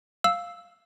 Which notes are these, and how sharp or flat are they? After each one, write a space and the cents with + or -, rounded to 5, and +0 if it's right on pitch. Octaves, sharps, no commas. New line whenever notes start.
F5 +0 E6 -5